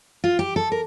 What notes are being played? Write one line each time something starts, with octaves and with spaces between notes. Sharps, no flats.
F4
G4
A4
A#4